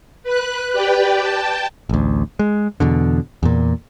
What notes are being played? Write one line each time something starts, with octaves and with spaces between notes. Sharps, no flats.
B4 F#6
G4 B4 D5 G5
G5 A5
A1 D2
G#3
E2 B2 D3
E2 A#2